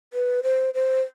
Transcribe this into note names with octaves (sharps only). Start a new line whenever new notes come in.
B4
C5
C5